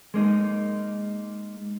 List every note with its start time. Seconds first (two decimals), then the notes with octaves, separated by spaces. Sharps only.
0.14 G#3 A#3 D#4